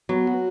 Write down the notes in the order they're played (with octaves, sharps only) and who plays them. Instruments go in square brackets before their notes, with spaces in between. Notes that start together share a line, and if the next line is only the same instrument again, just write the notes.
[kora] F#3 [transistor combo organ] B3
[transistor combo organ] F#4